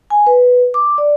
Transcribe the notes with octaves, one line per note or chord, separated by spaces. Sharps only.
G#5
B4
D6
D5